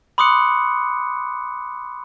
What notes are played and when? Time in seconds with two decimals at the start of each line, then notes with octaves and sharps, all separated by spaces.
0.18 B5 C6 D6 D#6 F#6 C#7